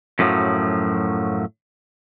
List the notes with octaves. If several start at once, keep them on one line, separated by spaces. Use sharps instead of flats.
F#2 A2 F3 F#3